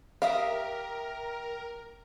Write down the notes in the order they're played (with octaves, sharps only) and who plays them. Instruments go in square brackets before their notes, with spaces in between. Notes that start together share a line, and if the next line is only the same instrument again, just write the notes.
[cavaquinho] G4 E5 D#6 [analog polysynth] A#4 [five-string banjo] F5